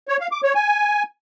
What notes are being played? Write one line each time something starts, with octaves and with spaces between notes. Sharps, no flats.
C#5
F5
D6
C#5
G#5